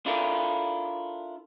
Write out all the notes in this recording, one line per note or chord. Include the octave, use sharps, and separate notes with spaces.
D4 E4 F4 A4 A#4